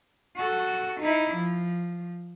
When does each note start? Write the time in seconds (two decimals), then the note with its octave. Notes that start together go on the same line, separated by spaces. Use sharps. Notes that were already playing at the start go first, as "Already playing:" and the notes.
0.37 F#4 A4
1.00 D#4 E4
1.35 F3